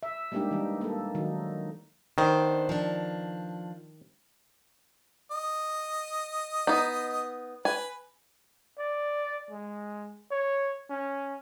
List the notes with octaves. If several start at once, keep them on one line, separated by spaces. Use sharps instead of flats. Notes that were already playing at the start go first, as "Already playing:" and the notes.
E5
G3 G#3 A#3 D4 D#4 G4
E3 G3
A#3 A4
D#3 F#3 D#4
D#3 B3 D4 C5
F3 D4
D#5
B3 D#4
B4 G#5
D5
G#3
C#5
C#4